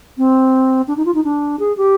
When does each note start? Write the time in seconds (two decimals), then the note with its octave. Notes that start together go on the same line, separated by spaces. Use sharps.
0.18 C4
0.88 D4
0.97 D#4
1.06 F4
1.14 D#4
1.24 D4
1.60 G#4
1.77 G4